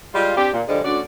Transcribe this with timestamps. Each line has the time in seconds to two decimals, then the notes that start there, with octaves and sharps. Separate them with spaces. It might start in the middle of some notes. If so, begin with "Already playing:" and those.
0.14 G3 G#3 F4
0.36 C4 D4 G4
0.53 A#2
0.67 D3 F3 G3 G#3
0.84 D2 C#4 F#4 D5